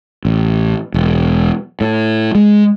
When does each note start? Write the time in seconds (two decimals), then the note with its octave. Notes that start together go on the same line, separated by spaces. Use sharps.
0.25 A1
0.94 E1
1.81 A2
2.35 G#3